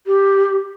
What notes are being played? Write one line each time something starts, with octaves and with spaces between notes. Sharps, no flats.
G4